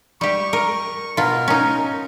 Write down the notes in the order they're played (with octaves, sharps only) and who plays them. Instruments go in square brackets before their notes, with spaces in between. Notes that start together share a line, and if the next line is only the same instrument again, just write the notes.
[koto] G3 G4 [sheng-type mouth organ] C#6
[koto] A#4 [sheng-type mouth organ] C#6
[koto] B2 F4 [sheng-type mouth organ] A#4
[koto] C#4 D#4